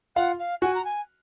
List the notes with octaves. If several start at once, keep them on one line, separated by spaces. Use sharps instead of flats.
F4 F5 F#5
F5
F#4 F#5 G#5
A#5
G#5